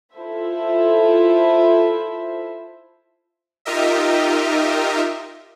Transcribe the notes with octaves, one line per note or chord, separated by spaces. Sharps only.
E4 F4 A4 C5 E5
D#4 F4 G4 A#4 D#5 E5